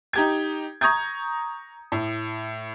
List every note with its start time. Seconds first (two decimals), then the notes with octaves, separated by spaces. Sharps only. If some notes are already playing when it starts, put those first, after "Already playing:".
0.13 D#4 G4 G#6
0.81 A#5 C#6 D#6 G6 G#6
1.92 A2